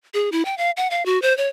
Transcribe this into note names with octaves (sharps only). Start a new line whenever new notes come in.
G#4
E4
G5
F5
F#5
F5
F#4
C5
C#5